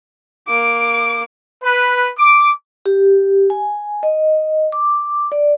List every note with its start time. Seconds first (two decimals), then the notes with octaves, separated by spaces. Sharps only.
0.48 A#3 D6 D7
1.63 B4
2.17 D6
2.86 G4
3.50 G#5
4.03 D#5
4.72 D6
5.32 D5